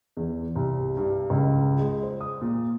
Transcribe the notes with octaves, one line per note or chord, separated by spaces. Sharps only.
E2
C2
G2
C#2
G#3
C5
D#6
A#2